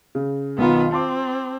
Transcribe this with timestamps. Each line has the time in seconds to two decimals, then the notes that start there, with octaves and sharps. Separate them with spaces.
0.15 C#3
0.58 B1 D#3 B3 F4 A#5
0.92 C4 A5 C6 D6